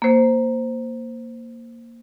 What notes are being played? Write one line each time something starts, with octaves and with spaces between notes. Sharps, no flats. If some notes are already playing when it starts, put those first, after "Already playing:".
A#3 C5